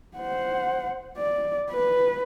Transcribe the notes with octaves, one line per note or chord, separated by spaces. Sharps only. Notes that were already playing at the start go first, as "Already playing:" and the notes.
C5 F#5
D5
B4